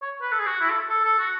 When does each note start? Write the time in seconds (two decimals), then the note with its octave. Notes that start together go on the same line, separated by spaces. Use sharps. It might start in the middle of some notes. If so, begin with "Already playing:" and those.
0.02 C#5
0.22 B4
0.32 A4
0.39 G#4
0.46 F#4
0.61 E4
0.70 A4
0.90 A4
1.04 A4
1.19 F#4